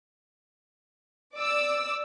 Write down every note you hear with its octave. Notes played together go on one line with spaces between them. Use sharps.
D5 D6 E6